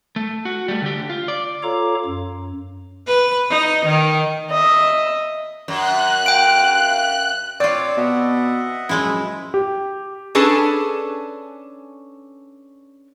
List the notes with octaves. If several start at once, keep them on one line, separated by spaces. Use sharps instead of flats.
A3
F#4
G3 A3
D3 G4
F4
D5
F4 A4 C#5 F5 A#5 D6
F#2
B4
D#4
D#3
D#5 E5
F#2 F#6
F5 G5 D7
C4 F4 C#5 D5 D6 E6
B2 D#5 E5 F#5
F#2 F3 G#3 E4
G4
C#4 D4 G#4 A4 B4